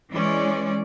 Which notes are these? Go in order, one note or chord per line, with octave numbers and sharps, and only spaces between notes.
E3 G#3 C#4 D5